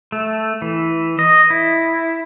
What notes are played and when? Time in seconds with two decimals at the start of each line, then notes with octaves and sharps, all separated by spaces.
0.12 A3
0.62 E3
1.19 D#5
1.50 E4